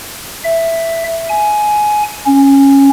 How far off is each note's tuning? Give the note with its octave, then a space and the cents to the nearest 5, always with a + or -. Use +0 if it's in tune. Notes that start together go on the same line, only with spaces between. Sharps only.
E5 +5
G#5 +15
C#4 -10